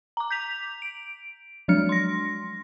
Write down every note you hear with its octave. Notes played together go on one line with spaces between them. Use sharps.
A#5 D6
G6 B6 F7
D7
F3 F#3 G#3 D4 F6 C#7
C6 A#6